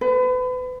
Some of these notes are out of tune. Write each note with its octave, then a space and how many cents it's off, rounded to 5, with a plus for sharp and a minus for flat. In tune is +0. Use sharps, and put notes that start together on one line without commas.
B4 +35